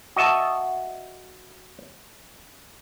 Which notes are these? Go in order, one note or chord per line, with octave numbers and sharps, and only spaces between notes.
F#4 D#5 E5 A5